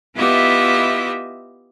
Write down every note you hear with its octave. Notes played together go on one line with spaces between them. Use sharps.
B3 E4 F4 G4 D#5 E5